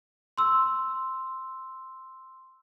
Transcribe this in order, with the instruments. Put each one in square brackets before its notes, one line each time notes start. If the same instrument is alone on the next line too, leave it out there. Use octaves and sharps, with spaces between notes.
[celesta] C6 E6